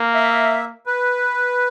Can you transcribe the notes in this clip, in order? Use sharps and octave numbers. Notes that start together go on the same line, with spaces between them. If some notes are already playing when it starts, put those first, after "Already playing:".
Already playing: A#3
E5
B4